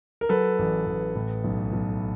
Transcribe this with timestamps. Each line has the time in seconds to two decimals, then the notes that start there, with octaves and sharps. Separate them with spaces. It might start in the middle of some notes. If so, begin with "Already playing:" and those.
0.21 A#4
0.29 F#3 A4 B4
0.59 A1
0.86 A1
1.15 A2
1.44 B1
1.73 B1